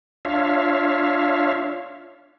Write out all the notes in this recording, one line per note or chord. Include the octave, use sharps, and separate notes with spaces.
D4 F4 C#5 E5 F5